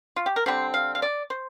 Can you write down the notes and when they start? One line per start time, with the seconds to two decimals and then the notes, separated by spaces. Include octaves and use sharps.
0.16 F4
0.26 G4
0.36 A#4
0.46 D3 G3 C4 C5
0.74 F5
0.95 F5
1.02 D5
1.30 C5